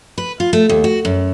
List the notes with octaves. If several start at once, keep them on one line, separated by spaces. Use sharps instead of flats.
B4
F4
A3
D#2
F#4
F#2